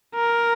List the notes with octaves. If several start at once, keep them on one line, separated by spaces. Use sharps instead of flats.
A#4